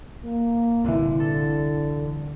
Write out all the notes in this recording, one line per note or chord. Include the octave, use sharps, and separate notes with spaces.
A#3
C2 A#2 D3 E3
D3 A4